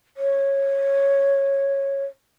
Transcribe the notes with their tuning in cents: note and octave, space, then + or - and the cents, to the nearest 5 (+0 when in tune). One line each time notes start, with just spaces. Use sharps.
C#5 -10